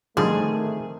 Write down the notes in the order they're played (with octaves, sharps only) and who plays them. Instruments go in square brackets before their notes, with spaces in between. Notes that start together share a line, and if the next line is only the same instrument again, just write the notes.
[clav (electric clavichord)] D3 F3 G3 [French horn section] D#3 A3 [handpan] C4 D#4 [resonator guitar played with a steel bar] G#4